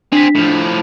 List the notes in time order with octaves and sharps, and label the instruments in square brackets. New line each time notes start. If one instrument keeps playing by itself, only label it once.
[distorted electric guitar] C4 G#4 [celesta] D4 B6
[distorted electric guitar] A2 F3